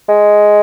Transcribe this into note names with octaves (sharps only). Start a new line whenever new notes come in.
G#3